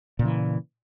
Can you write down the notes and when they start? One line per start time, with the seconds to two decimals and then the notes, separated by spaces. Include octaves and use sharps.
0.19 A#2
0.22 C#3
0.25 E3